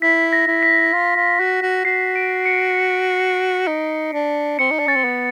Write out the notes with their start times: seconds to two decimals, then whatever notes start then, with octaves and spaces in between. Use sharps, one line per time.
0.02 E4 B6
0.33 A#6
0.47 E4
0.63 B6
0.93 F4
1.16 F4
1.40 F#4
1.62 F#4
1.85 F#4 C7
2.16 D7
2.46 C#7
3.67 D#4
4.13 D4
4.59 C4 C#7
4.71 D#4
4.79 D4
4.87 C#4 A6
4.96 C4
5.05 B3